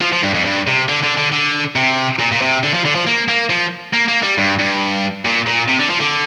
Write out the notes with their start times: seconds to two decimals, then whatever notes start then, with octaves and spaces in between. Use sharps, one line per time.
0.01 F3
0.13 F3
0.23 G2
0.34 F2
0.45 G2
0.67 C3
0.89 D3
1.03 D3
1.17 D3
1.32 D3
1.76 C3
2.19 A#2
2.32 A#2
2.42 C3
2.63 D3
2.74 F3
2.85 D3
2.95 F3
3.07 A#3
3.28 A#3
3.50 F3
3.94 A#3
4.08 A#3
4.23 G3
4.38 G2
4.59 G2
5.25 A#2
5.47 A#2
5.68 C3
5.79 D3
5.90 F3
6.01 D3